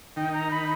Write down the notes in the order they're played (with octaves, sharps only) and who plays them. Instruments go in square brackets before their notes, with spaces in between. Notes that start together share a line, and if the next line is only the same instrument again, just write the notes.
[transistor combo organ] D#3 D#4 [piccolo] G5
[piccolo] A#5
B5